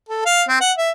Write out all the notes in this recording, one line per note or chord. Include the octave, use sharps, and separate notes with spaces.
A4
F5
C4
F#5
E5